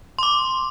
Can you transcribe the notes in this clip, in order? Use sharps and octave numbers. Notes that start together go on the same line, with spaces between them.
C6
D6